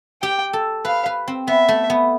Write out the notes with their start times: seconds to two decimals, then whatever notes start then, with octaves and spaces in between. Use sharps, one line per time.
0.22 G4 G5
0.53 A4
0.85 B4 F5
1.06 B4
1.28 C4
1.47 B3 E5
1.68 A3
1.90 B3